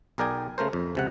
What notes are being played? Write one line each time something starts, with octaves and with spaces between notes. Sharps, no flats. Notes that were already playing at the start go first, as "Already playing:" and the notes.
B1 G#4 A#4 D5 G5 G#5
C#3 A3 A#4 C5
F2
C#2 C3 F#5